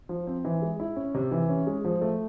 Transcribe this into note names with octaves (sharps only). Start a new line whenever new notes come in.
F3
C4
E3
G#3
E4
C#4
C3
E3
C#4
G#3
F3
A3